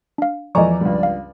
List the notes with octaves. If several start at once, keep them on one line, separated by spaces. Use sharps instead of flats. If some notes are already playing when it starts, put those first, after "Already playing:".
D4 F5
E2 F3 D5 D#5 G#5 A#5 C#6
C#2 G2
F5